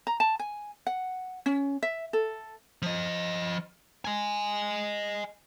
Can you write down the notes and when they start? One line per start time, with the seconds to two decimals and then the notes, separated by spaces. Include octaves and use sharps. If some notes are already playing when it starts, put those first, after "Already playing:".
0.07 A#5
0.20 A5
0.39 G#5
0.87 F#5
1.46 C#4
1.83 E5
2.13 A4
2.82 F3 D#5
4.05 D#5 G#5